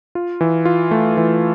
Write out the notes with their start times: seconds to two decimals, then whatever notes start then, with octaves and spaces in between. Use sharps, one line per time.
0.15 F4
0.41 E3
0.65 F4
0.91 A3
1.17 E3